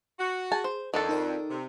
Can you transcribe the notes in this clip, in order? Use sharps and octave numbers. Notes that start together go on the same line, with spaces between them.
F#4
G#4 G#5 A5
C5
F2 D#3 D4 A4
D#4 A#4 D5
C3